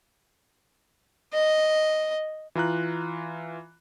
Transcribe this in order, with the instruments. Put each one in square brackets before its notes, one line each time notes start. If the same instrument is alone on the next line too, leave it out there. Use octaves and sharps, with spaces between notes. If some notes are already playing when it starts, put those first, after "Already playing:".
[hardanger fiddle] D#5
[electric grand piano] E3 F4 A#5 F#6